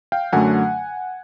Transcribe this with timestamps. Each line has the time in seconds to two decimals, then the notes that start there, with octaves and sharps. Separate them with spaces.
0.12 F5 G5
0.33 F#2 D3 F#3 A3 F#5 G#5